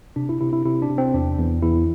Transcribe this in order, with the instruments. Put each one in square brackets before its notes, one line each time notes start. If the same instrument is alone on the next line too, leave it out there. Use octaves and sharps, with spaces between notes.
[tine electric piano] C3 D4
E4
C3 E4
E4
C3 E4
D4
C3
C4
E2 D4
E2
E2 E4